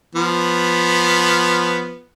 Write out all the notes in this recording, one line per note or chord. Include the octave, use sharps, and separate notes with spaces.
F3 B3